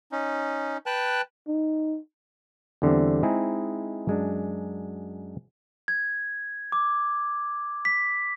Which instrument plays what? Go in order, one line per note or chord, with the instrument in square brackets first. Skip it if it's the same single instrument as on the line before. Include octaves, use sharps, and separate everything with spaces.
[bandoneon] C#4 D#4
B4 G5 A5 F#6
[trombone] D#4
[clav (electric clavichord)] E2 D3 G3 C4
G#3 C4 D#4 E4 G#4
F#2 G#3 D4
[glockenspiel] G#6
D6
B6